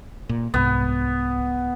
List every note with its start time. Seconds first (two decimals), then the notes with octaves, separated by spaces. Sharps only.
0.29 A#2
0.54 C2 G#2 B3